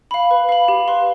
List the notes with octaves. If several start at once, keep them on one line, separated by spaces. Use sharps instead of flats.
F5 B5
B4
F5 B5
G4
B4 F5 C6